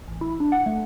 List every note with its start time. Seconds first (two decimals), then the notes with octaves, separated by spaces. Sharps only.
0.08 A1
0.21 E4
0.40 D4
0.52 F#5
0.66 A3